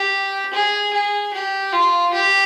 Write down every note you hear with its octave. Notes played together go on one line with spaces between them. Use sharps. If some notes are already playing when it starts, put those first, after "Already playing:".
Already playing: G4
G#4
G#4
G4
F4
G4